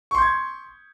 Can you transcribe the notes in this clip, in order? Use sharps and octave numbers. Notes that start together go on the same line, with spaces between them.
C6 C#6 G6 G#6